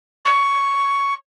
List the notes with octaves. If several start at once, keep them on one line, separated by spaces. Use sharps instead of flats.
C#6